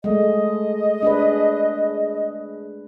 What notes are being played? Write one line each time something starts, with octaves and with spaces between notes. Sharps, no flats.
G#3 A3 D#5
D4 G#4 B4